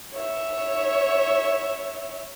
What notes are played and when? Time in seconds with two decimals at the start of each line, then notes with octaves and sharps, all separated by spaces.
0.13 C#5 E5